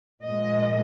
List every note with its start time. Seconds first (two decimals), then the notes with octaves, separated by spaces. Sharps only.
0.22 A#2 F3 G#3 D#5